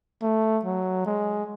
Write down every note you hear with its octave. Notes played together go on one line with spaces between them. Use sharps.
A3
F#3
G#3